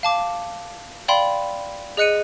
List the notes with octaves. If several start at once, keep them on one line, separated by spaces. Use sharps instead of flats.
F5 A5 D6
D5 F5 G5 B5 C6
G#4 D#5 F#6 C#7 D#7